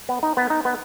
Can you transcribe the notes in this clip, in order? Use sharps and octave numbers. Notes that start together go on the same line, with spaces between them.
B3
D#4
B3
D#4
B3